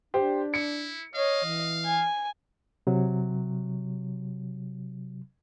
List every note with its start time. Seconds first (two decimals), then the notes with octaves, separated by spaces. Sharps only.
0.14 D4 G4 C5
0.54 E4 C#7
1.15 C#5 D#5 F5
1.45 E3
1.85 G#5
2.87 C3 F#3